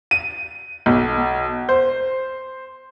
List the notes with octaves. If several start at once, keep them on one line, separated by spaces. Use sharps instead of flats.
D#7
B1
C5